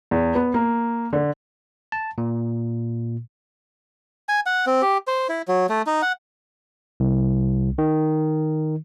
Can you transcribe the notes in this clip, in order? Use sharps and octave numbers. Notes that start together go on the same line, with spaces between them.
E2
B3
A#3
D3
A5
A#2
G#5
F#5
C4
G4
C5
E4
F#3
A3
D#4
F#5
C2
D#3